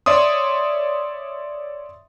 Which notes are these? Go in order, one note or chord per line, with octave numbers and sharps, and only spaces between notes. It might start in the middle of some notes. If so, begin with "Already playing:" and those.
C#5 D5 E5 C6 D#6